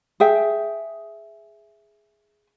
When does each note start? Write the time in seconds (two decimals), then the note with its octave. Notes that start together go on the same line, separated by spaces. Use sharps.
0.20 G#4 E5 G5